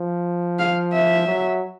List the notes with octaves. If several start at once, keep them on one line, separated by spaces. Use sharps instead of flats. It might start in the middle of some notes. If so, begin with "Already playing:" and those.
Already playing: F3
F5
E5
F#3